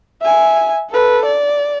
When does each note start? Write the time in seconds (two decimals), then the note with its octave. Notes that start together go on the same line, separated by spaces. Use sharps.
0.21 E5 G#5
0.90 A4 B4
1.26 D5